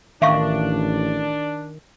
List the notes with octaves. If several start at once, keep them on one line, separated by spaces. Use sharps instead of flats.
A1 D#3 D4 E5 F5 C#6